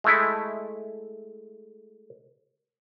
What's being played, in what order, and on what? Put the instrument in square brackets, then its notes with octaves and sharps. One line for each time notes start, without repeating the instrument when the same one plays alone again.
[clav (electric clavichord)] G#3 A3 E4